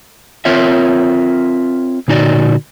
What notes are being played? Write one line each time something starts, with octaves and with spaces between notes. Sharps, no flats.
C4 F4 A#4 C#5 E5
A#2 D3 D#4 F#4 D5